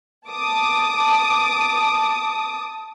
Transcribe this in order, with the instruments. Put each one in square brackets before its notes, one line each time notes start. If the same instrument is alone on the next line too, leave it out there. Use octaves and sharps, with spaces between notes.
[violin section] A5 D6 D#6